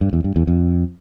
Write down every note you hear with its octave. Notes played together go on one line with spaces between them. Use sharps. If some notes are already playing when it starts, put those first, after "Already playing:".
G2
E2
G2
E2
F2